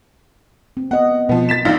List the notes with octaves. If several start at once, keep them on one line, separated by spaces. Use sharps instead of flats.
C4
B3 D#5 F#5
B2 F3 B3
A6 B6 E7
A#1 D4 D#4 D5 F5